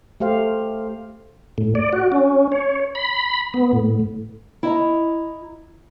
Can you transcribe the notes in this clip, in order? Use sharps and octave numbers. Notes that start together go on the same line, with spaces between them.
A3 G4 C5 F5
A2
D5
F#4
C#4
C#5
B5
B3
A2
E4 D#5 A#5